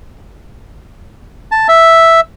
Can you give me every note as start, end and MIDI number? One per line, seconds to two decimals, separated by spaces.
1.52 1.67 81
1.68 2.20 76